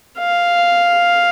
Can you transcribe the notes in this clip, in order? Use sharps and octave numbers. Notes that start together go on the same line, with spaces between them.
F5